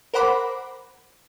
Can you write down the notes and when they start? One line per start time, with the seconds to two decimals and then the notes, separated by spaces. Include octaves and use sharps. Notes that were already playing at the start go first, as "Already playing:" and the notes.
0.14 A#4 C5 F#5 B5 D6